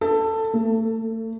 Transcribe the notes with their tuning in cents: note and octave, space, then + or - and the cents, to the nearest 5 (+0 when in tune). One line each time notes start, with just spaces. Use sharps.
A4 +15
A3 +35